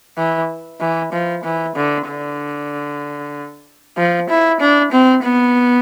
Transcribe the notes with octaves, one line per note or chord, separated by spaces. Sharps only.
E3
E3
F3
E3
D3
D3
F3
E4
D4
C4
B3